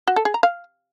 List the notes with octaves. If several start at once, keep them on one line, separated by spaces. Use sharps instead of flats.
F#4
A4
G#4
A#5
F5